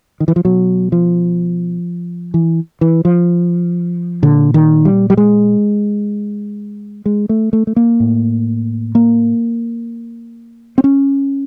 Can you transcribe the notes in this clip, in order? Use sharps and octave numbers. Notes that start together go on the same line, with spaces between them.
D#3
E3
F3
B2 F#3
F3
E3
E3
F3
A#2 D3
D#3
G3
G3
G#3
G#3
A3
A3
A3
A#3
A2
A#3
C4
C#4